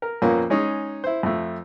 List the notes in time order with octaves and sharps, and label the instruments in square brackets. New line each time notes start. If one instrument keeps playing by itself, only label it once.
[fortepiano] A#4
F2 A#2 A#3 B3 C#4
G#3 C#4 D#4 G#4
E4 C5
F2 A3